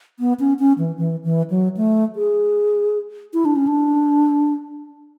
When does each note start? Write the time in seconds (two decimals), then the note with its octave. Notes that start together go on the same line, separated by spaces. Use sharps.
0.20 B3
0.40 C#4
0.59 C#4
0.78 E3
0.98 E3
1.24 E3
1.50 F#3
1.77 A3
2.16 G#4
3.34 E4
3.45 D4
3.56 C#4
3.67 D4